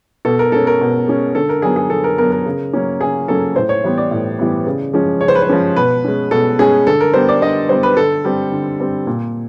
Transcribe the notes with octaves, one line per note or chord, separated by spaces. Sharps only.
B2 A4
A#4
G#3 C#4 A4
A#4
B2
G#3 C#4
D3 A4
A#4
F#3 B3 G#4
G#4
D3 A4
A#4
F#3 B3 A#4
A#4
C#3
F#3 A#3 C#4
C#3 G#4
F#3 A#3 C#4 A4
A2 C5
C#5
E3 G3 B3
D5
A2
E3 G3 B3
C#3
F3 G#3 C#4
C#3 C#5
C5
B4
C5
F3 G#3 C#4
B2 B4
G#3 C#4
B2 A4
G#3 C#4 G#4
D3 A4
A#4
G3 B3 C5
D5
D3 D#5
G3 B3 C5
B4
D3 A4
G3 C4
D3
G3 C4
A#2